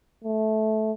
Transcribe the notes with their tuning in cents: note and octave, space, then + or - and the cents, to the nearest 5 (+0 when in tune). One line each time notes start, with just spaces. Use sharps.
A3 -15